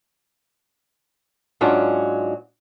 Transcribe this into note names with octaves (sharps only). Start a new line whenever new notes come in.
G#2 F#3 C#4 D4 F4